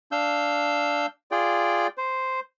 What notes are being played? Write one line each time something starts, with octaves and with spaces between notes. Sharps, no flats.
D4 F5 E6 G6
F4 G#4 D5 G5
C5